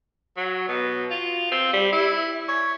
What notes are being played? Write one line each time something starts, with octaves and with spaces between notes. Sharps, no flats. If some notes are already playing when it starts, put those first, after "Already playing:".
F#3
B2
F4
C4
G3
E4
C#5